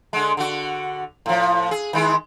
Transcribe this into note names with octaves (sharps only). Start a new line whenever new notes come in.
D3 G#3
D3 F#4
A2 F3
G#4
D#3 G#3 E4